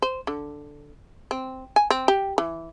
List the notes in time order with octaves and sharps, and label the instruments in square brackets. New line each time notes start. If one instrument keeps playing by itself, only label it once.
[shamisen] C5
D3
C4
G#5
C4
G4
E3